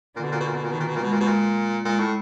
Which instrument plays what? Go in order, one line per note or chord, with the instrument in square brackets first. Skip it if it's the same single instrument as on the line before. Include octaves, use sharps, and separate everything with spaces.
[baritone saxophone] A#2 [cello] D3
[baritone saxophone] B2
A#2
B2
A#2
B2
A#2
[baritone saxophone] B2 [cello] D#3
[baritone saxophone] A#2
B2
A#2
[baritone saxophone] B2 [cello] G#3
[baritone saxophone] A#2
B2
A#2
[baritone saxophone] A#2 [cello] G#3
[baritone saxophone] A2